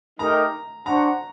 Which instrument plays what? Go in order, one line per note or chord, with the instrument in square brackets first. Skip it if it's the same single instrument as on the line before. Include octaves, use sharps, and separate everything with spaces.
[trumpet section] A3 D#4 G4 A#4 D#5 [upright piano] A#5
[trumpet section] D4 F#4 C5 F#5 [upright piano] A#5